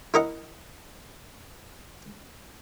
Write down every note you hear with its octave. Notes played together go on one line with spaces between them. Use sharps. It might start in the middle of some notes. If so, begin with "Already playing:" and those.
E4 A#4 D#5 F#5